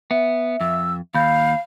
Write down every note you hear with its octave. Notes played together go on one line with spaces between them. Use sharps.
B3 E5
F2 E6
D#2 F5 B5 G6